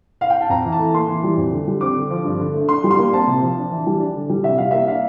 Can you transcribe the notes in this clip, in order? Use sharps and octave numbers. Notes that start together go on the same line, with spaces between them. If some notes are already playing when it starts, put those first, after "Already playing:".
F5
G5
A5
F2 A#5
E3
A5
A3
A#3 C6
E3
G3
F2
D3
G3
C4 D6
D3
F3
G2
D3
A3
D4 C6
G3
C6
A#3
C4 A5
C3
F3
D4
E3
G3
D4
D3
G3
C3 E5
G3 F5
A#3 E5
D4 F5